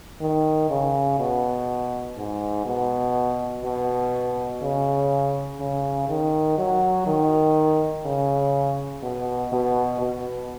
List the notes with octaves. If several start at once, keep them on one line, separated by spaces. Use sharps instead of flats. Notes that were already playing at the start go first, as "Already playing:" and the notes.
D#3
C#3
B2
G#2
B2
B2
C#3
C#3
D#3
F#3
D#3
C#3
B2
B2
B2